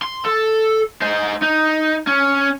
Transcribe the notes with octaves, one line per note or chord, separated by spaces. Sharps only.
C6
A4
D#4 C5
D#4
C#4